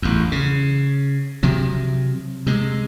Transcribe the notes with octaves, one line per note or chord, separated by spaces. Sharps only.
A1 E2
C#3
C3 F3 F#3
C3 G#3